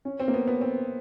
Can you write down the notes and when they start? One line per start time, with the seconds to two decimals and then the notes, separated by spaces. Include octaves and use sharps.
0.05 C#4
0.20 C4
0.28 A#3
0.34 B3
0.48 B3
0.61 C4